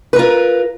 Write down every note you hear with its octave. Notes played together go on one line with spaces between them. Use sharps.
F4 A#4 B4